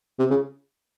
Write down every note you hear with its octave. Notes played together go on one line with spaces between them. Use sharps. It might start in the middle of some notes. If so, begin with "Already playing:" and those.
C3
C#3